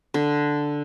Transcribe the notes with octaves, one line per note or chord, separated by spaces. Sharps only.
D3